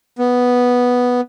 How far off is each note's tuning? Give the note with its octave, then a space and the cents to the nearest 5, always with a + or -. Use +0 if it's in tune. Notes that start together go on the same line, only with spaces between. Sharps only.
B3 +0